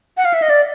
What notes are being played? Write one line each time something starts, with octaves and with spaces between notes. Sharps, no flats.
F#5
F5
E5
D#5
D5